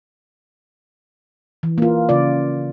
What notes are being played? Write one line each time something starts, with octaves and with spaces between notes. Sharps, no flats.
E3
A#3 F4
C#3 F4 D5